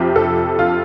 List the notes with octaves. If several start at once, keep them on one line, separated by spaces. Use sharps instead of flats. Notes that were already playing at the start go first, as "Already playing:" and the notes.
Already playing: F2 C3 F3 C4 G4
A4
F4